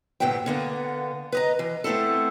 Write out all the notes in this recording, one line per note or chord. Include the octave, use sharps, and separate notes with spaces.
D2 G2 A#2 B3 E4 G5
D3 A#3 B3
B4 D#5 A#5
E3
A3 B3 C4 E4 A4